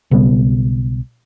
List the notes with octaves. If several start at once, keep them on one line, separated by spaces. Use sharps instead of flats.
B1 C#3 G3 B3